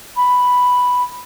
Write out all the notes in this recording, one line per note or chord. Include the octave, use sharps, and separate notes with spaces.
B5